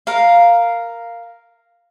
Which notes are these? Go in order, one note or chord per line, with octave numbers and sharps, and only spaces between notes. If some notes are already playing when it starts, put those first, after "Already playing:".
A#4 F5